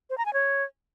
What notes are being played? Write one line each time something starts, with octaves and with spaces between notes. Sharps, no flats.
C5
A#5
G#5
C#5